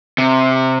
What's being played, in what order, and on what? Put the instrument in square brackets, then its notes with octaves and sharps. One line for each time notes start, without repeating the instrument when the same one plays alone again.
[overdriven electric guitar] C3